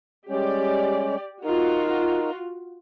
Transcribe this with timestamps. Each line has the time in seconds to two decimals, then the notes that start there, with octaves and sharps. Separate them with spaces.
0.29 G3 G#3 C#4 G4 D5
1.44 D#4 F4 F#4 A#4